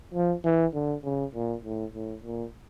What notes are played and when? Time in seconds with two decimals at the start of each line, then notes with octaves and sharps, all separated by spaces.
0.14 F3
0.45 E3
0.74 D3
1.04 C#3
1.35 A#2
1.64 A2
1.94 A2
2.24 A#2